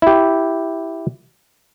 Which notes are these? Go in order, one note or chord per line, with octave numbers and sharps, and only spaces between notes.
E4 G4